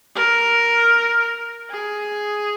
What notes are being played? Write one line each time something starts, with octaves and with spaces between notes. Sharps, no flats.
A#4
G#4